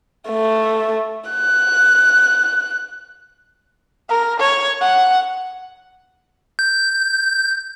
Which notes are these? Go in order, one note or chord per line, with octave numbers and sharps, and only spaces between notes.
A3
F#6
A#4
C#5
F#5
G6